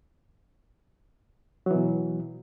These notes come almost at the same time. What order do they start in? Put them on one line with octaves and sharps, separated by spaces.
F#3 E3 B2